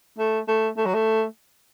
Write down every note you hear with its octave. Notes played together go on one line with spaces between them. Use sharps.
A3
A3
A3
F#3
A3